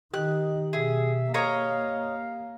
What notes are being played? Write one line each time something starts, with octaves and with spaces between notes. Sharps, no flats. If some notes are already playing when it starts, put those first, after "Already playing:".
D#3 G4 D#5 F#6
B2 G#4 E5
A#3 C#5 D#5 F5 A#5